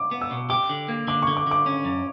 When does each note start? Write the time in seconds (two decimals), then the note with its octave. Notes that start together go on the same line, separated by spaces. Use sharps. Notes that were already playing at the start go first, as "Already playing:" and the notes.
Already playing: D6
0.11 B3
0.21 E6
0.31 B2
0.50 G4 D6
0.69 D3
0.88 A#3
1.07 D3 D6
1.22 C#6
1.27 D3
1.37 D6
1.47 D3 D6
1.66 C#4
1.85 F#2